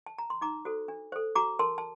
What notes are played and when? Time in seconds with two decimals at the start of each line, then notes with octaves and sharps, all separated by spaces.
0.06 A5
0.18 A#5
0.30 C6
0.41 D#4 A#5 D6
0.65 F#4 A4 C5
0.88 D4
1.12 A4 C5
1.35 F#4 A#5 D6
1.59 A#4 A5 C6
1.78 A5